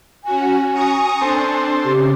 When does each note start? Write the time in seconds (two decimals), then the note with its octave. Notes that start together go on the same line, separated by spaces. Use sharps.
0.24 C#4 F#4 G#5
0.73 A#5 C#6 D#6
1.21 C4 D4 A4 C5
1.84 C#3 G4